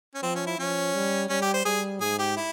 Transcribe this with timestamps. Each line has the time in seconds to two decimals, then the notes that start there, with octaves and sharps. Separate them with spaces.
0.15 C#4
0.23 F3 C4
0.35 C#4
0.47 E4
0.58 F3 C#4
0.94 G3
1.29 G3 C#4
1.42 G4
1.54 C5
1.65 G3 G#4
2.01 G#2 G#4
2.19 G4
2.37 E4